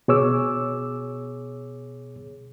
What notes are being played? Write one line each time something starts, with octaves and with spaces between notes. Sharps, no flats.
B2 G#4 C#5 D6 E6